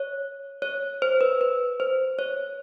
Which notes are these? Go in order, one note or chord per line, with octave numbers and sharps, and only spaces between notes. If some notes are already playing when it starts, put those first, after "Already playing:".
Already playing: C#5
C#5
C5
B4
B4
C5
C#5